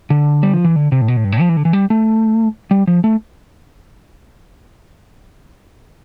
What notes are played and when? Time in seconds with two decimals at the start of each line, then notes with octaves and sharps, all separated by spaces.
0.10 D3
0.43 G3
0.54 F3
0.64 E3
0.76 D3
0.92 C3
1.01 A2
1.08 B2
1.17 A2
1.24 G2
1.32 A2
1.40 F3
1.49 E3
1.57 D3
1.65 E3
1.73 G3
1.90 A3
2.71 G3
2.87 F3
3.04 A3